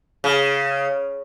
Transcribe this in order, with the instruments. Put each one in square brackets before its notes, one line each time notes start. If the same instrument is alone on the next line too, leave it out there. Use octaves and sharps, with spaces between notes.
[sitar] C#3